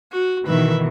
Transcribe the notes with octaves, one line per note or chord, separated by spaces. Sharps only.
F#4
B2 D#3 E3 B4 E5